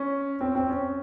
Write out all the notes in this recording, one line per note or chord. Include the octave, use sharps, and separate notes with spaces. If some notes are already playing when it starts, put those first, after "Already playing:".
Already playing: C#4
C4
C4
C#4